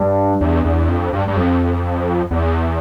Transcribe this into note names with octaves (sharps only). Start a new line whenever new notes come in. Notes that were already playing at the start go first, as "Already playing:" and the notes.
Already playing: G2
E2
E2
F2
G2
G2
F2
E2